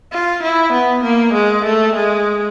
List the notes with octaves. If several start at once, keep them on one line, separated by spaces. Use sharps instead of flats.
F4
E4
B3
A#3
G#3
A3
G#3